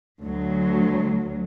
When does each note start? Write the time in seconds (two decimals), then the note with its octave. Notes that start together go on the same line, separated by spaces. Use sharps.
0.23 D2 F#3